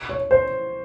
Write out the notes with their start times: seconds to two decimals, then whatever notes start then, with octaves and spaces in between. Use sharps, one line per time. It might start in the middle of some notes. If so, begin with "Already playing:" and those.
0.09 C#5
0.31 C5